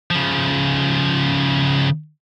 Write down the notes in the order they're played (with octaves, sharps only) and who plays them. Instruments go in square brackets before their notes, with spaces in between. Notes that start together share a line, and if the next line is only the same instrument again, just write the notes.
[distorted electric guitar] C#3 F3